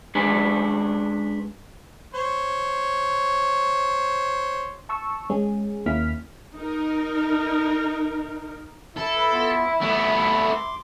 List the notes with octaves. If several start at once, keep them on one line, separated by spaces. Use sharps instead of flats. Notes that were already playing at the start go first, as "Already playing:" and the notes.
G#3 C#4 D4 G#4 B4 D5
C5 C#5
A5 C#6 E6
G#3 C#4 G#4
D#2 A#3 C#4 E4 F6 B6
D#4 A#4
E4 A4
B4
B3 F4 B5
A3 B3 B5
C6 D6